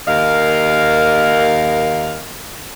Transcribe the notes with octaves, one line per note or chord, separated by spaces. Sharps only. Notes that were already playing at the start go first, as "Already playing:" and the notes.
D#2 A#4 D#5 F5